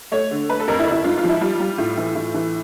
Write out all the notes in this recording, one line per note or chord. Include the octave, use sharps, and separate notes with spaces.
A3 C#5
D3
A3 B4
A4
F2 A#4
E4
G1
E4
G#2 F4
F4
F3
E4
G3 F4
G3
A2
E3
A2
E3